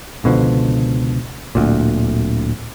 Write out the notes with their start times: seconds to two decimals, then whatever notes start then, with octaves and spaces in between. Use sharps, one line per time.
0.24 C#2 B2 D3 F3
1.55 D1 D2 A#2